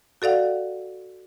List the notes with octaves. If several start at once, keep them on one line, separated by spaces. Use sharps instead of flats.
F#4 A4 D5 F5 F#5